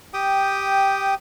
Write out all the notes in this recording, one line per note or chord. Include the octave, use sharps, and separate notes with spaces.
G4 G5 D#6